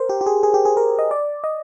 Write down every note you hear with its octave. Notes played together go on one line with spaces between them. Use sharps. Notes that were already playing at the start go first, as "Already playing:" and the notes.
Already playing: A#4 C5
G4
G4
G#4
G#4
G4
G#4
A#4
D#5
D5
D#5